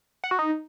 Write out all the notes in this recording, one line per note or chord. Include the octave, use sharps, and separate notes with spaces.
F#5
F#4
D#4